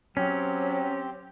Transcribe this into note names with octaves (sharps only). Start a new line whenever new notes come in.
F#3 C4 C#4 G4 C5